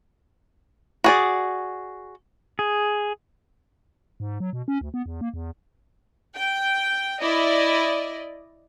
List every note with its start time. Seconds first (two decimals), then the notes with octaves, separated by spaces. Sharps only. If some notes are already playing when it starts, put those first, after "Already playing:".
1.04 F#4 G#4 D5
2.59 G#4
4.20 G#2
4.40 F#3
4.53 B2
4.68 C#4
4.81 D2
4.94 B3
5.06 E2
5.21 A#3
5.34 E2
6.35 G5
7.22 E4 D5 D#5